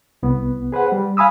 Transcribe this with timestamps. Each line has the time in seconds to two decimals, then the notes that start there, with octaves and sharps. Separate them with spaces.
0.23 C2 B3
0.72 G#4 B4 C5 F#5
0.92 G3
1.17 F5 G#5 B5 D#6 E6